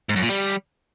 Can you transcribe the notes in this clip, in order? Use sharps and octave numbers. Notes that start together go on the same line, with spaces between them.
G#2
F#2
A#2
G3